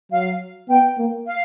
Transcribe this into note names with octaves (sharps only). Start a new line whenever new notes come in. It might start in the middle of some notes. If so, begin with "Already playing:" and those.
F#3 F5
B3 G5
A#3
F5